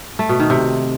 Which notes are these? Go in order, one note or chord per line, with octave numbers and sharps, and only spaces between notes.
A3
B2
D#3
C3